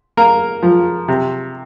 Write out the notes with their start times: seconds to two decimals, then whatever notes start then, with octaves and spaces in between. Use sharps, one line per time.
0.17 A#3 A#4
0.63 F3
1.08 C3